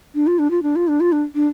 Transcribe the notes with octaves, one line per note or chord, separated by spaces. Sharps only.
D4
F4
D4
F4
D4
F4
D4
F4
D4
D4